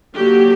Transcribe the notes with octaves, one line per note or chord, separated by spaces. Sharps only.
D3 F#3 A#3 G4